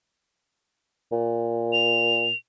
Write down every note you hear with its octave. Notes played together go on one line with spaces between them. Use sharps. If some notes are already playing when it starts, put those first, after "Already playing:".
A#2
F7